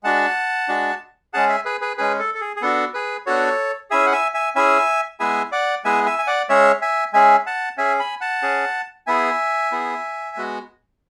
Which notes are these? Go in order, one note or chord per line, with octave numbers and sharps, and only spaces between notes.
G#3 D4 F#4 F#5 A5
G#3 D4 F#4
G#3 C#4 G#4 F#5 A5
E5 G#5
G#4 B4
G#4 B4
G#3 C#4 G#4 B4
A4
A4
G#4
G#4
B3 D4 F#4 A4
G#4 B4
B3 D4 F#4 A4 C#5
C#4 E4 G#4 E5 G#5
F#5
E5 G#5
E5 G#5
C#4 E4 G#4 E5 G#5
G#3 B3 E4 G#4 E5 G#5
D5 F#5
G#3 B3 E4 G#4 E5 G#5
E5 G#5
G#5
D5 F#5
G#3 C#4 G#4 C#5 E5
E5 G#5
G#3 C#4 G#4 E5 G#5
F#5 A5
C#4 G#4 E5 G#5
G#5 B5
F#5 A5
C#4 G#4
B3 E4 G#4 E5 G#5
B3 E4 G#4
G#3 B3 F#4